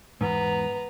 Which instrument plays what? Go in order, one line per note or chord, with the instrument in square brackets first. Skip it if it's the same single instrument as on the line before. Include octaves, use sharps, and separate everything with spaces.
[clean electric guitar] E2 G#2 [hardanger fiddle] B3 A#5